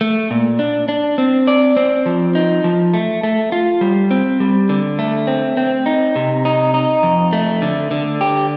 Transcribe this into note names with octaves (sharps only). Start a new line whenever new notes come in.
A3
A#2
D4
D4
C4
D5
C4
F3
D#4
F3
A3
A3
F4
G3
C4
G3
D3
A3
C4
C4
D#4
C3
D#4
D#4
F2
A3
D3
D3
G4